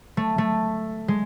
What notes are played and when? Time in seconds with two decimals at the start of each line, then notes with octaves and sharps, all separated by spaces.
0.17 A3
0.38 A3
1.08 G#3